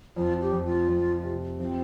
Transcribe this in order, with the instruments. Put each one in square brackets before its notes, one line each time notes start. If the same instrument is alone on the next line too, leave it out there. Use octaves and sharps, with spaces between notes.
[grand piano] F2 [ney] F4
[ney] G4
[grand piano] F2
[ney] F4
[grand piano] F2
C3
[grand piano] F3 [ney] C4